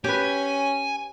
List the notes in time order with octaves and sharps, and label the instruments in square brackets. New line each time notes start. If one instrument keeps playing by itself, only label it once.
[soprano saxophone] C#4 [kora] G4 B4 [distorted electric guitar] G#5